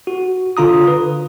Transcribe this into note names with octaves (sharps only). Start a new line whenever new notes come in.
F#4
D3 F4 A#5 D#6
B4